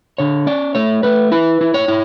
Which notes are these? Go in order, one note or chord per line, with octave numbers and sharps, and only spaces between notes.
D3 C#5
C#4 D5
A3 C#5
A3 B4
E4 B4
E4
C#5
E4